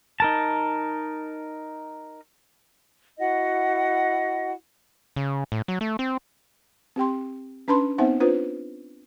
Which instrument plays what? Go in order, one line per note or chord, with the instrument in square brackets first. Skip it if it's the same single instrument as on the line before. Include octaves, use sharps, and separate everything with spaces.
[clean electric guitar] D#4 A#4 A5
[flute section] E4 F#4 D#5 F#5
[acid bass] C#3
A2
F#3
A3
C4
[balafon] C4 G4 G5 C6
C#4 D4 B4 A5 B5 C6
B3 C4 D#4 C5 E5 F#5
D4 F4 B4 C5